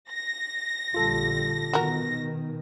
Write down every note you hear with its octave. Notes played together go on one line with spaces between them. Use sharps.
A#6
A#1 D3 G3 F4 A4 A5
B2 D#3 F#4 A#4